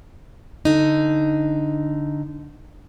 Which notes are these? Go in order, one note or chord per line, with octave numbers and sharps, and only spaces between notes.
D3 D#4